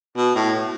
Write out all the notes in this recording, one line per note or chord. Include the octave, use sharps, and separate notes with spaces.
B2
A2